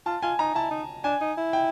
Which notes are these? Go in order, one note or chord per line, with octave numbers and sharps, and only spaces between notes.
F4 A5
F4 G#5
D#4 A#5
E4 A5
D#4
D4 G#5
D#4
E4
G5